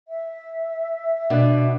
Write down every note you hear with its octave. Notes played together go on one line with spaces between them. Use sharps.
E5
B2 D4